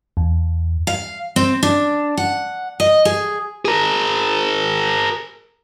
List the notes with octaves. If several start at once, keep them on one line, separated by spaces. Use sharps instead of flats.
E2
F5
C4
D4
F#5
D#5
G#4
G#4 A#4